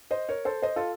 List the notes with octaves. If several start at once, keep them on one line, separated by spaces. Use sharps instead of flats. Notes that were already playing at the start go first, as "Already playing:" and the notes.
C5 D#5
A#4 C#5
A4 C5
C5 D#5
F4 A4